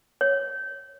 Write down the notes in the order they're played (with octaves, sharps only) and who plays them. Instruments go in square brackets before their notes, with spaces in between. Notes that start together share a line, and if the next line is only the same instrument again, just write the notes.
[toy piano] C#5